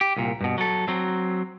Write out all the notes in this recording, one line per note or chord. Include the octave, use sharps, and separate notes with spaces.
G4
C2 A#2
G2 B2
F#3 A4
F#3 C4